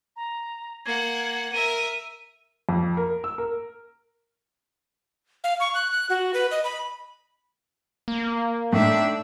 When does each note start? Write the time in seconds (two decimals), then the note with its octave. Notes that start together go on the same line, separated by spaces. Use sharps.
0.16 A#5
0.85 A#3 F#5 G#6
1.53 A#4 E5 D#7
2.69 F2
2.97 A#4
3.24 E6
3.38 A#4
5.44 F5
5.60 C#6
5.74 F#6
5.91 F#6
6.10 F#4
6.34 B4
6.51 D#5
6.64 B5
8.08 A#3
8.73 A2 D4 D#4 E5